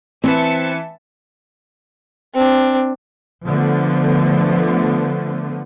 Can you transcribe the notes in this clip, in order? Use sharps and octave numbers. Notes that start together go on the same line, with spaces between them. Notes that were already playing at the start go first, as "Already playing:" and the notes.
E3 C4 B4 E5 A5 C#7
C4 D4
D3 F3 A3 B3